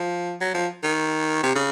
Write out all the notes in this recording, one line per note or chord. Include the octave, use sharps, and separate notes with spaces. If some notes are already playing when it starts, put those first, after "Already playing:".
Already playing: F3
F#3
F3
D#3
C3
C#3